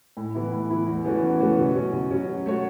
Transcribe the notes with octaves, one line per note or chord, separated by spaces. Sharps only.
A2
E3 B3 E4
A2
E3 B3 E4
E2
E3 A3 C#4 F#4
E2
E3 A3 C#4 F#4
B2
F#3 C#4
B2
F#3 C#4
F#3
A3 F#4 C#5